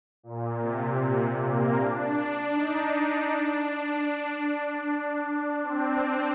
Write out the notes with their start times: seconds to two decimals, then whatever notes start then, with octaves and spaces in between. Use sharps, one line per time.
0.23 A#2
0.61 C3
1.40 A#3
1.77 D4
2.17 D4
2.54 D#4
2.93 D4
3.32 D4
3.71 D4
5.63 C4